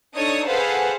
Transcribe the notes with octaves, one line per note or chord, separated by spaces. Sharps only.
D4 D#4 A4 C#5 C#6 D#6
G#4 A4 B4 C5 F5 F#5